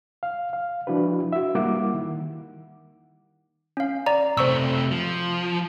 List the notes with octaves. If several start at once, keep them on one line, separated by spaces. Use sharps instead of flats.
F5
F5
F3 D4 E4 F#4 B4
F#4 E5
G3 A#3 E4 F#5 D6
D#3
C#4 F5
D5 A#5
C3 A3 C5 C#6 E6
F3